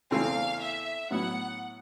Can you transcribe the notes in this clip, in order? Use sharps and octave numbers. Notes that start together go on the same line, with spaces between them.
E2 C#3 E3 A3 C4 F5
E5
A2 F#3 B3 E4 F#5